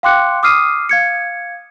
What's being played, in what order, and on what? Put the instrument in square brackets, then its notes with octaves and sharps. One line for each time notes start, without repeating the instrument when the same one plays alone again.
[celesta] F5 G5 C6 D6 F#6 C#7
D6 D#6 F6 C7 D#7
F5 G#6 C#7